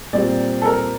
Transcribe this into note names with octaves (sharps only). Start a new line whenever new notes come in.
A#2 G3 C4 G4 D5
A4
A#4